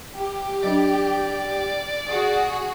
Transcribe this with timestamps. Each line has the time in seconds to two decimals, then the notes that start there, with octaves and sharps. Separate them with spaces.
0.15 G4
0.63 F#3 D4 D5
2.07 F#4 G#4